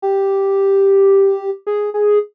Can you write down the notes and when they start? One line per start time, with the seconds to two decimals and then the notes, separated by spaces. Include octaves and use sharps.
0.02 G4
1.67 G#4
1.94 G#4